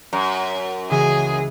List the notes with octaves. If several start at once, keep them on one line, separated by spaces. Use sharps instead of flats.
F#2 A#5
C#2 C#3 E3 G#4